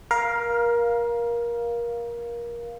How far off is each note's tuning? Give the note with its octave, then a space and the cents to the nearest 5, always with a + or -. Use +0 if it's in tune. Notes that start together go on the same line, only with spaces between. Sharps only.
A#4 +25 F5 +0